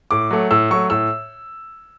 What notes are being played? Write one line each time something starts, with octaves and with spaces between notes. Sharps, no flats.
A2 D6
F#3 A3
A2 E6
F#3 A3 C#6
A2 E6